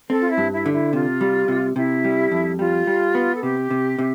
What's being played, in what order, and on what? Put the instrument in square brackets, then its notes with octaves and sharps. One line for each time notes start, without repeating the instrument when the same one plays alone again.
[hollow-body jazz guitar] C4 [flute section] A4
[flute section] F4
E4
[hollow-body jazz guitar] G2
[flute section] E4
[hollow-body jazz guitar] D3
[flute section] E4
[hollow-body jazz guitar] C3 [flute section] F4
[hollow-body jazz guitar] G3
C3
[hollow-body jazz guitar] C3 [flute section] E4
[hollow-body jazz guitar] G3
F2
[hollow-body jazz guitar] G3 [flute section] F4
[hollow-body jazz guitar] G3
B3
[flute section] A4
[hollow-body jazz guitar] C3 [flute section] G4
[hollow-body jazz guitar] C3
C3